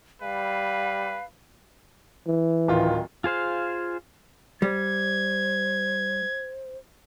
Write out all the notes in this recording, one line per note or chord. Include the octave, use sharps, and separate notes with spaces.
G3 B4 F5
E3
D1 D#3 F4
F4 G#4 C5 F5
G3 C5 G#6